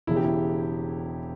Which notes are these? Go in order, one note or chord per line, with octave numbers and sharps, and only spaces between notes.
E1 E2 C#3 E4
G4
E4